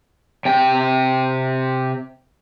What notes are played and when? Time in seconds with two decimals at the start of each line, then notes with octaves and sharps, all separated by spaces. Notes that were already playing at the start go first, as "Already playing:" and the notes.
0.45 C3 G5